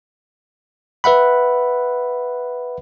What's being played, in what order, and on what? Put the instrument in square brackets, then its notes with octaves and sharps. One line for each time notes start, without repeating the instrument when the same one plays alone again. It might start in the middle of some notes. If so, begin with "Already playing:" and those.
[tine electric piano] B4 E5 F#5 B5